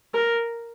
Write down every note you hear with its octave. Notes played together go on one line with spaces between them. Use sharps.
A#4